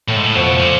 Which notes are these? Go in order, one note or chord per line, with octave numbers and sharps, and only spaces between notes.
A2 A3
G#2
A2
F2 B2
A2
A#2